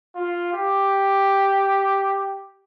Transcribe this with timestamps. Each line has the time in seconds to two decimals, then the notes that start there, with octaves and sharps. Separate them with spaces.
0.15 F4
0.53 G4